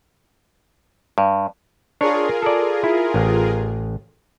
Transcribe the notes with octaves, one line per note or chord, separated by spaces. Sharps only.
G2
D4 F4 G#4 A#4 C#5
A4 D5
E4
A1